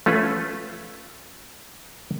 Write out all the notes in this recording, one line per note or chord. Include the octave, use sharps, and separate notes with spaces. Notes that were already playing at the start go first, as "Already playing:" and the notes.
A3 C#4 F4 A4 B4